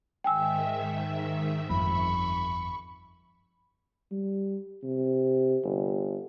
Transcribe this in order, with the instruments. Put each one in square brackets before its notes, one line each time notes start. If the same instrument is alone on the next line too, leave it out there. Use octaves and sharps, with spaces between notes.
[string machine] G#2 D#3 E5 [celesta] G5 G#5 E6
[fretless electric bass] G1 F2 [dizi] B5 [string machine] C#6
[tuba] G3
C3
G1